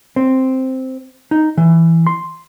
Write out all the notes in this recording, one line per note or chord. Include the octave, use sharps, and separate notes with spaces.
C4
D#4
E3
C6